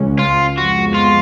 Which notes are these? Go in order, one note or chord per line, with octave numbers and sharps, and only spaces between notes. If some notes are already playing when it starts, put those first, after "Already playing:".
Already playing: C#2 C#3 G#3 C#4
F4
F2 F3 G#3 B3 F#4
F4